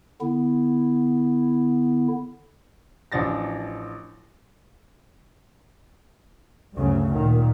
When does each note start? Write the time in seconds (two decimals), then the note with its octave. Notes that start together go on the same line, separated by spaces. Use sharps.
0.21 D3 B3 E4
3.12 A1 F3 D4 A6 A#6
6.75 D2 G2 C#3 F#3
7.14 A#2 D#3